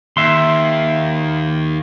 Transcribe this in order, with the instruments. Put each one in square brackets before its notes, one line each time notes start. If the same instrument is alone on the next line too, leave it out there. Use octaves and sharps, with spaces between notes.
[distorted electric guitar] D#2 [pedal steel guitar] E5 C6